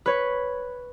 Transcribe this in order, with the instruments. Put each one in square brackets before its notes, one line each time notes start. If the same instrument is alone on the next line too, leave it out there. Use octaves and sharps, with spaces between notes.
[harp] B4 C#5